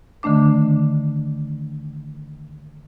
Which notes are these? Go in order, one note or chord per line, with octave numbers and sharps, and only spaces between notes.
D3 D#3 A3 D4 D6